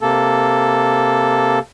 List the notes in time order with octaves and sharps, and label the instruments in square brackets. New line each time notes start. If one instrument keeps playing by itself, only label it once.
[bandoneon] C3 A#3 A4